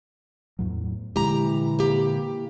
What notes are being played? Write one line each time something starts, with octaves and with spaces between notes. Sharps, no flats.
E2 A2 F#3
A#2 D3 E3 G#3 G4 A#5
A#3 G4